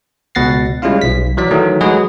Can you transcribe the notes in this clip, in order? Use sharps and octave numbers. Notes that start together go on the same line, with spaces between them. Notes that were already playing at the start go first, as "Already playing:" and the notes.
C#2 B2 F#5 A6 A#6 C7
G3 G#3 C#4 E4 F4 F5
B1 B6
E3 F#3 D5 B6
D#3 E3 F#3 A3
F#3 G#3 F#4 G#4 B4 D#5